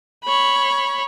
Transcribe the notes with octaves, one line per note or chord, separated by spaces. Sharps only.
C#5 B5